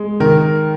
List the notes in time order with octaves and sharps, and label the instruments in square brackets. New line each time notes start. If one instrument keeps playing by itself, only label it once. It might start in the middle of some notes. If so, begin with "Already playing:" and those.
Already playing: [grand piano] G#3
D#3 A#4